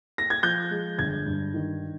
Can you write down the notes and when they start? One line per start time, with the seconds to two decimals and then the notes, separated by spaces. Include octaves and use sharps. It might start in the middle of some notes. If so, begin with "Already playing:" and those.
0.18 A#6
0.30 G#6
0.43 F3 G6
0.71 G#3
0.98 G1 G#6
1.26 G2
1.54 D#3